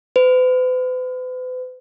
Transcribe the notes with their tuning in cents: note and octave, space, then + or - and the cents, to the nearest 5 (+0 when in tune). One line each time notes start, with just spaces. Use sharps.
B4 +45